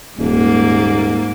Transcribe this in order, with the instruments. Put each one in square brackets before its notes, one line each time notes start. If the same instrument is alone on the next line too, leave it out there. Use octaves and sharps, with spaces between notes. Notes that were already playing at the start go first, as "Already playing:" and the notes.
[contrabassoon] D#1 [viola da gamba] G#2 A#3